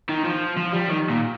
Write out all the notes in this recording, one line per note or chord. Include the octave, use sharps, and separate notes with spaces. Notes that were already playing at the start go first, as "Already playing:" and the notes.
D#3
F3
F3
G3
D#3
A#2